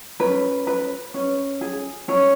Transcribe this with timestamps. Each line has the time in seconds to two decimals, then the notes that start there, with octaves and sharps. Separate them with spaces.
0.20 C#4 B4
0.67 B4
1.14 C#4
1.61 G#4
2.08 C#4 C#5